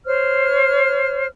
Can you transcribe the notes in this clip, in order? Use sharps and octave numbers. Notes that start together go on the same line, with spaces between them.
C5 C#5 F6